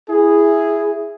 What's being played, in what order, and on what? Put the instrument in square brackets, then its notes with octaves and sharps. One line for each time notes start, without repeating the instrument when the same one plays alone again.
[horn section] E4 G#4